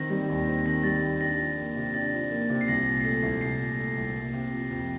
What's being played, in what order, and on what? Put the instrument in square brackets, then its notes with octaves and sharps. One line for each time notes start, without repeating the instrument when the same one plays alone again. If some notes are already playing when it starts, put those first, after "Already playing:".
Already playing: [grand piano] D#3 C4 [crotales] A#6
[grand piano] G3
D#2
C4
[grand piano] D#3 [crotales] A#6
[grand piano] G3 [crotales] A6
[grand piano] D#2
[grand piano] D4 [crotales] A#6
[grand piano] F3
A#3
C3
[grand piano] D4 [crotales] A6
[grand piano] F3
A#3
C3
[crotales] C7
[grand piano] C2 [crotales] A#6
[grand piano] A#2
[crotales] C7
[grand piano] A3 [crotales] A#6
[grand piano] C2
[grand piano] C2 [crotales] C7
[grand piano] A#2
A3
C2
A#3
C3
F3
F2